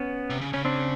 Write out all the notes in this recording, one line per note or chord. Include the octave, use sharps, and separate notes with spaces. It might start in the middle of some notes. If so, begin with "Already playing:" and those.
Already playing: B3 C#4
C3
C#3
C#3 C#4
C4 D4